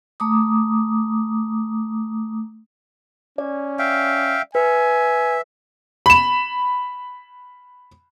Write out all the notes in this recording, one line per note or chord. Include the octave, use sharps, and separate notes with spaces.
A3 A#5 D6 D#6
C#4 D5
E5 F5 G5
B4 E5 G#5
B5 E7